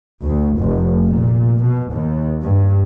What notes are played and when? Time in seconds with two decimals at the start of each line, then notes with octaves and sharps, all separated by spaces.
0.24 D2
0.59 F1
1.05 A#2
1.61 B2
1.91 D#2
2.43 G2